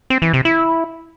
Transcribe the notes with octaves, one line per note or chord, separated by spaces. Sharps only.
C4
E3
C3
E4